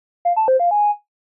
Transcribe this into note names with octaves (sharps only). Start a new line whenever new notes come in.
F5
A5
C5
F5
G#5